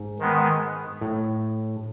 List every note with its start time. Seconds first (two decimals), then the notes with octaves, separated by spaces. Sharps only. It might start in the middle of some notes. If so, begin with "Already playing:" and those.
Already playing: G#2
0.19 D#3 G#3 B3
1.01 A2